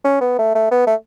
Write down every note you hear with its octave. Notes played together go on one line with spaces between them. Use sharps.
C#4
B3
A3
A3
B3
A3